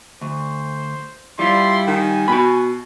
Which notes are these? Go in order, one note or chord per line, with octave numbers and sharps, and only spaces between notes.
D2 C5
G3 E4 F4 C6
D#3 G#5
B2 F#4 B5